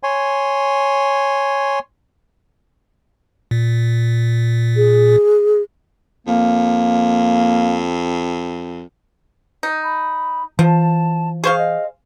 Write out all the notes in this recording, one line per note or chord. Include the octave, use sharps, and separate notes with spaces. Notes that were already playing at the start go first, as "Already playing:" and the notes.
C#5 G#5 C6
A#2
G#4
F2 A#3
D#4
B5
E3 F3 A5
G#4 C5 F5 C#6
D#5